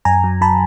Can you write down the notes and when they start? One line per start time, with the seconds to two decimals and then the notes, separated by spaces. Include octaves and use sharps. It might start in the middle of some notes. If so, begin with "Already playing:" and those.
0.05 F#2 G#5 A#5
0.24 F#3
0.41 F#3 A5 B5